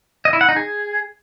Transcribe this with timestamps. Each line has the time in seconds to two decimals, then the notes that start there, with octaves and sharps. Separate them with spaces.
0.25 D#5
0.33 E4
0.41 F#5
0.49 D#4
0.56 G#4